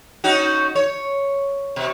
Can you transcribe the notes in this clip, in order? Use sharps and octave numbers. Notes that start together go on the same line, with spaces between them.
C#4 D#4 F#4
C#5
B2